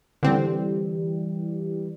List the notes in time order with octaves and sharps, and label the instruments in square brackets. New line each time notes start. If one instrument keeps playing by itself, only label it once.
[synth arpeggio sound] D3 C4 [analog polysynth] E3 G3